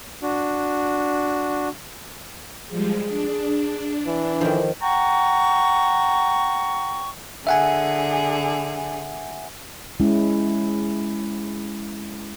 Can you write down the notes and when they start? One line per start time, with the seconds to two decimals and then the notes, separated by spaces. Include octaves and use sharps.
0.22 D4 F#4
2.70 F3 G3 G#3 G#4
3.07 D4
4.07 E3
4.41 D#3 F3 A4
4.80 F#5 G5 A#5 C#6
7.47 D3 G#4 E5 F#5 G#5
10.00 G#3 C#4 E4